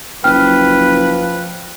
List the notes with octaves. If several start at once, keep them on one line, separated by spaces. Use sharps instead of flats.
F#1 F3 B4 G5 F6